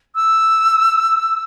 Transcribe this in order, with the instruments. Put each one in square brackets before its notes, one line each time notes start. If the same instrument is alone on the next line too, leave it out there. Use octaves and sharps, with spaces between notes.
[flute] E6